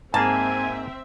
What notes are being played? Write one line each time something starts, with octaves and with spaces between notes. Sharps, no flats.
G#2 A#3 C4 G#4 E5 G#5 A5